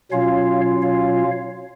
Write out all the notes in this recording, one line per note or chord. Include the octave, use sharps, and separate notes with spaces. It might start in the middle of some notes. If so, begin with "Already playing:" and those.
B2 F#3 C#4 F4 C#5 F5
C#5 F5